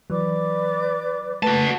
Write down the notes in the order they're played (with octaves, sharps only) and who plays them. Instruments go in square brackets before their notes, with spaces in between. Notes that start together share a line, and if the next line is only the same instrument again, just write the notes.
[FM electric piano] E3 F#3 [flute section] B4 D5 D6
[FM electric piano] A3 B4 [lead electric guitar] F#4 A5